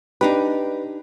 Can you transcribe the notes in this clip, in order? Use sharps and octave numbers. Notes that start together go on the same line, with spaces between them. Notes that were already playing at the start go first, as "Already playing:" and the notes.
D4 D#4 G4 B4